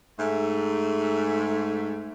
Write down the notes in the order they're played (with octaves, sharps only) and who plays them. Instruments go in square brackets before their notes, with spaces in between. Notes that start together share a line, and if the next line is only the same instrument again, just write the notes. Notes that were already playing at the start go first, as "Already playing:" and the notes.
[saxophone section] G#2 A3